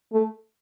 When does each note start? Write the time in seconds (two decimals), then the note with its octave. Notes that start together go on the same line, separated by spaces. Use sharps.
0.13 A3